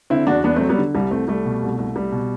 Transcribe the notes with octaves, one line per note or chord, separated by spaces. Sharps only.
D3 C4 E4
E2 D4 F#4
E2 B3 D4
A3 C4
F#3
G3 B3
D3
C2 G3
C2 A3 C4
G3 A3
B2
C2
C2
G3
B2